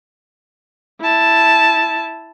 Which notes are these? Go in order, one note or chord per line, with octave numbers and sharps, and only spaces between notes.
E4 A5